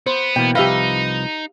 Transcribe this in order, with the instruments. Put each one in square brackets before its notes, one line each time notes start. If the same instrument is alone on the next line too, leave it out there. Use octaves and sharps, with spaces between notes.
[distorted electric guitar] B3 [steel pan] C5
[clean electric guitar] B2 E3 A#3 [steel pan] G5
[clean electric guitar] C2 F3 B4 [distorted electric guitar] D#4 [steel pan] G4 E5 F5